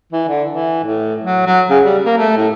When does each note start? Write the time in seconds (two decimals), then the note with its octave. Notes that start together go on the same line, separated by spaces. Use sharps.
0.13 E3
0.28 D3
0.51 E3
0.84 A2
1.22 F#3
1.46 F#3
1.70 C#3
1.84 G3
2.05 A#3
2.18 A3
2.37 A2